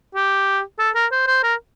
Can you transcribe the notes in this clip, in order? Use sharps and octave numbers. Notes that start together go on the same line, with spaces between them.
G4
A4
A#4
C5
C5
A#4